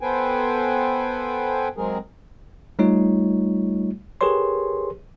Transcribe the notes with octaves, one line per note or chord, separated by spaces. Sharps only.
B3 A4 B4 C5 G5 G#5
F#3 G#3 C4 G#4 A#4
G3 A3 D#4 F4 C#5
G4 G#4 A#4 B4 C#5 C6